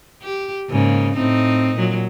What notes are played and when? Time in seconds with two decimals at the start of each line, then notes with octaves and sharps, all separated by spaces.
0.22 G4
0.69 G#2 C#3 A#3
1.15 A2 C4 D#4
1.75 A#2 F#3